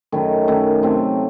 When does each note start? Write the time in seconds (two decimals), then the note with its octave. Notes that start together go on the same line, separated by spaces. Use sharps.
0.12 F#2 D#3 A3
0.48 F#2 D#3 A3
0.83 C3 F#3 A3 C4